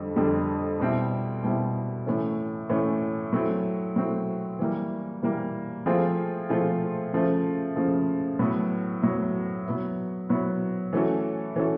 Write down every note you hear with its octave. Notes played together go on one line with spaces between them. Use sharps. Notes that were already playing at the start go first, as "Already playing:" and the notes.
Already playing: F2 D3 G3
F2 D3 G3
B2 G3 C4 E4
B2 G3 C4 E4
A2 E3 A3 C#4
A2 E3 A3 C#4
F#3 A3 C4 E4
F#3 A3 C4 E4
E3 G3 A#3
E3 G3 A#3
F3 A3 C4 F4 G#4
F3 A3 C4 F4 G#4
C#3 F3 A3
C#3 F3 A3
A2 F#3 B3
A2 F#3 B3
F#3 B3 E4
F#3 B3 E4
E3 A3 C#4 F#4 A4
E3 A3 C#4 F#4 A4